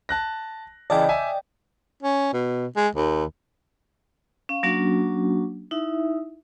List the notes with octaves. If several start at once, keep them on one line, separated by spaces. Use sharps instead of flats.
A5 F#6 A#6
C#3 E3 D5 D#5 G5 A5
E5 G#5
C#4
B2
G#3
D#2
C#4 F5
F#3 A#3 C#4 D4 F#4
D#4 E4 E5